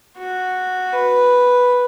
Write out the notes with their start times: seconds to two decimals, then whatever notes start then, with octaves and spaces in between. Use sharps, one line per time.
0.17 F#4
0.93 B4